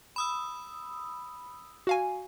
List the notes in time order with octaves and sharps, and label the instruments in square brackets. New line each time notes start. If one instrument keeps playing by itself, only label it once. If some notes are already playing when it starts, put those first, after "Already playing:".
[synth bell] B5 D#6 E6
[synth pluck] F#4 F5 G#5